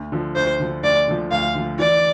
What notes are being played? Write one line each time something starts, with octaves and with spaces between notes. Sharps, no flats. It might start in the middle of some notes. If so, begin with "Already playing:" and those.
Already playing: D2
D3 F3
D2 C5
D3 F3
D2 D5
D3 F3
D2 F5
D3 F3
E3 D5